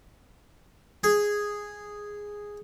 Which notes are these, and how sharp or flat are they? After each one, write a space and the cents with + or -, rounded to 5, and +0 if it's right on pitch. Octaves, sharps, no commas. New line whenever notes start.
G#4 -5